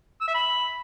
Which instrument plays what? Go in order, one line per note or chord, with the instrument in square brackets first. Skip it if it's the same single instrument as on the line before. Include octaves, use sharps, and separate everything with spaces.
[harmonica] E6
E5
B5